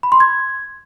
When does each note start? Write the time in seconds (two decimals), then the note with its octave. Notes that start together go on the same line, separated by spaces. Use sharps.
0.03 B5
0.12 C6
0.20 G#6